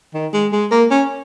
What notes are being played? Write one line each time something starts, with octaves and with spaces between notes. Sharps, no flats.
D#3
G#3
G#3
A#3
C#4